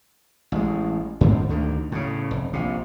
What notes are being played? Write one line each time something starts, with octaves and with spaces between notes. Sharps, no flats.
A1 G#3
G#2 D3 G#3 C4
D2 D3 D#3
A2 C#3
F1
A#1 C3